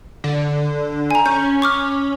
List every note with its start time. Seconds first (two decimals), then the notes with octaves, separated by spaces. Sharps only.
0.24 D3
1.11 G#5 A#5
1.26 C#4 G6
1.62 C#6 D6 F6